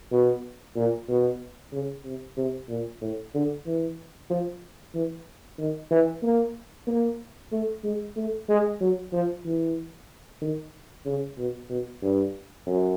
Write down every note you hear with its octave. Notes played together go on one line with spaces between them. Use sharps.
B2
A#2
B2
C#3
C3
C3
A#2
A2
D3
E3
F3
E3
D#3
E3
A#3
A#3
A3
G#3
A3
G#3
F#3
F3
E3
D#3
C#3
B2
B2
G2
F#2